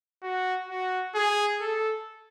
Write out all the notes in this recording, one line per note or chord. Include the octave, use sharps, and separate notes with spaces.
F#4
F#4
G#4
A4